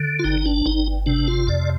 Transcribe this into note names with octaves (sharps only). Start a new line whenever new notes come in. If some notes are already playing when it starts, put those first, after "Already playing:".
Already playing: D3
F4
G1 D#4
D4
G1 D#4
C3 D4
F4
F2 D5